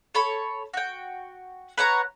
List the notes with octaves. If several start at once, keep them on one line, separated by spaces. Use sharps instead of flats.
A4 C#5 B5
F#4 G5
B4 C#5 F#5 A#5